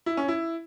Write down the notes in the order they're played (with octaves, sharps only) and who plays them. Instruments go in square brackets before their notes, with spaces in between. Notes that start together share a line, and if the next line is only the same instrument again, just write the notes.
[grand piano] E4
C#4
E4